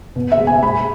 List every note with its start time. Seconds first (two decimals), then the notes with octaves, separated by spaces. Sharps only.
0.16 B2
0.32 E5
0.39 G#3
0.47 G#5
0.63 G#3 B5